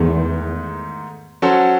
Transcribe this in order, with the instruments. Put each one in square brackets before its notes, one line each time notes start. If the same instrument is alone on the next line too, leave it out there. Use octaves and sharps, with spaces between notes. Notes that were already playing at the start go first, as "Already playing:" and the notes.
Already playing: [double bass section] E2 [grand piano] G#2 D#3 A3
[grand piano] F#3 C#4 F#4 A4 C5